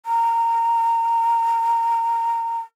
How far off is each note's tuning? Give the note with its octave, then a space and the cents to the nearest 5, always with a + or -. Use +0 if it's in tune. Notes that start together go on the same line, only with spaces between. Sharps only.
A#5 -20